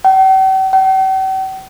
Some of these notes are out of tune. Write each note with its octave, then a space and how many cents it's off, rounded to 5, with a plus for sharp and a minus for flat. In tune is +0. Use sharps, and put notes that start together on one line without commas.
G5 -45
G5 -45